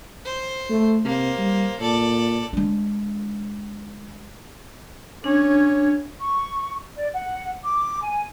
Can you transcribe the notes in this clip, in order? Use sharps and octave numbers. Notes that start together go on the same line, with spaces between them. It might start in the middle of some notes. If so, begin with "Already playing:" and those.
C5
A3
C3 A#3 C5
G3
A#2 A4 D5
G#3 D4
C#4 D4 C#5
C#6
D5
F#5
D6
G#5